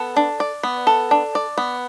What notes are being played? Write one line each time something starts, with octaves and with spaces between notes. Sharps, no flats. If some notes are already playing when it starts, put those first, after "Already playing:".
Already playing: B3 A4
D4
D5
B3
A4
D4
D5
B3